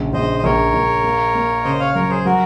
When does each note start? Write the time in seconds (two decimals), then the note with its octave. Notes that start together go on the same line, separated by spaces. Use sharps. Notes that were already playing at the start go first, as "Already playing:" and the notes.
Already playing: A#1 C#3
0.13 A#1 C5 D#5
0.39 D#5
0.44 A#1 A#4 C#5
0.74 A#1
1.04 A#3
1.35 A#3
1.64 C#3 C5 D#5
1.79 C#5 F5
1.95 F#3 A#4 C#5
2.10 G#4 C5
2.25 F#3 F#4 A#4